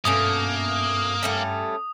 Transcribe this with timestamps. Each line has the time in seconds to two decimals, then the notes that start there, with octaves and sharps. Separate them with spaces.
0.05 G2 B2 A3 A#3 C#4 D#6
1.23 G3 A3 C#4